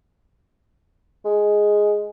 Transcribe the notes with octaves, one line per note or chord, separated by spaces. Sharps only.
G#3